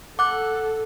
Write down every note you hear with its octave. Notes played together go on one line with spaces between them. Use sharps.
A4 F#5 D6 F#6